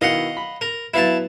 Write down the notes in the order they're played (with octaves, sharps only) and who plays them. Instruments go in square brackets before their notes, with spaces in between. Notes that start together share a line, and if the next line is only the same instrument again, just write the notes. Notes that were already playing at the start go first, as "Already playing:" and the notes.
[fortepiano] B2 D#3 E4 [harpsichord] D#5 F5 F#5
[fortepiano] B5
[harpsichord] A#4
[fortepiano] F#3 B3 B4 [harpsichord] E4 F5 A5